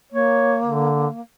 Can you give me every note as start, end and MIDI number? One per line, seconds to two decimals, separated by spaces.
0.13 1.21 58
0.13 0.57 73
0.65 1.07 50